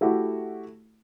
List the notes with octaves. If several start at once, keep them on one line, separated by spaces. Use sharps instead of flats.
A3 E4 F#4 G4